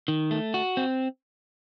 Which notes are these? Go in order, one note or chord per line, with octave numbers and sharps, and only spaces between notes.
D#3
A3
F#4
C4